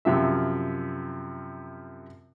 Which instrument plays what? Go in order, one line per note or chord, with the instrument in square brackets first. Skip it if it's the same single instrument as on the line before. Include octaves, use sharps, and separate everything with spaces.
[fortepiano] F#2 C3 F3 E5